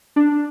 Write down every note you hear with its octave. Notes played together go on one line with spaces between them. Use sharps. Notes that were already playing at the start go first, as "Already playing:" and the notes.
D4